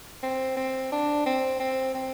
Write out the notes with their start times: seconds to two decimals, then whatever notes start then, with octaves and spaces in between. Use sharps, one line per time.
0.23 C4
0.57 C4
0.92 D4
1.26 C4
1.60 C4
1.95 C4